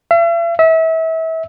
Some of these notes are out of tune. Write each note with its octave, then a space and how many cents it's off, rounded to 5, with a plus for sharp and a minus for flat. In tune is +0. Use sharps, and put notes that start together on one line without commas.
E5 +45
E5 -30